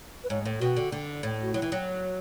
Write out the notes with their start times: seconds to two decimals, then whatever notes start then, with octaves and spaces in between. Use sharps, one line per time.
0.24 B4
0.30 G#2 C#5
0.45 A2
0.60 B2 F#4
0.77 D3
0.92 D3
1.23 A2
1.42 F#4
1.53 F#3 E4
1.62 E3
1.72 F#3